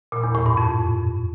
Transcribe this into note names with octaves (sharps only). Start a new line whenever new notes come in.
A#2
E2
A2
G2
F2